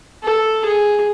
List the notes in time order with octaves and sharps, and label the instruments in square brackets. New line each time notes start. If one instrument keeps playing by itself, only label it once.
[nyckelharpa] A4
G#4